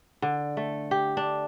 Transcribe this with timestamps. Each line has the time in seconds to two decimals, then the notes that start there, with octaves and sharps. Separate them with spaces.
0.22 D3
0.57 A3
0.91 G4
1.17 D4